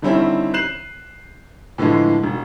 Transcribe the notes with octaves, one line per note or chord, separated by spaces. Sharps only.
D3 D#3 G3 C4 C#4 E4
F#6 G6 C7 E7 F#7
A2 D3 E3 F3 G#3
E1